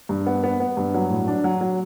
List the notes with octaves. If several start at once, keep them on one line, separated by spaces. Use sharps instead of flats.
G2
B3
B3
B3
G2
F#3
A2
D4
F#3
F#3